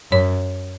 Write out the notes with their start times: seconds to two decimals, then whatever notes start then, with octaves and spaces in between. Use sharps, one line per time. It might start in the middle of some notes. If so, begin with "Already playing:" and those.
0.12 F#2 C#5